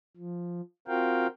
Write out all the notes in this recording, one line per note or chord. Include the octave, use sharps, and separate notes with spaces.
F3
C4 F4 F#4 A#4 F5 G5